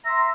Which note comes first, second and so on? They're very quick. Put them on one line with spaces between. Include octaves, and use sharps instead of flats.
E5 A#5 C6